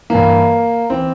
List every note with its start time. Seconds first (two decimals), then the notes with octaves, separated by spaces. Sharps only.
0.10 G2 E3 A#3
0.90 E3 C4